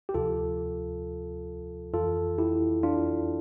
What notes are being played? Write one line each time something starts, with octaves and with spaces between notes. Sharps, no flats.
G4
D2 C3 F3 F4 A4
F2 E3 F4 A4
E4 G4
D4 F4